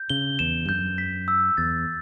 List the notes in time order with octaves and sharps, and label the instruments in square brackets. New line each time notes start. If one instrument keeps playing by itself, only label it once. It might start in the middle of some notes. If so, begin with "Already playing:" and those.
Already playing: [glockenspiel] G6
[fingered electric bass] C#3 [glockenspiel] G7
[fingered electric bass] E2 [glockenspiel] E7
[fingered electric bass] G2
[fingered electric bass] F#2 [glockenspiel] G6
[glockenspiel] B6
E6
[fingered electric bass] E2 [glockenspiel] A6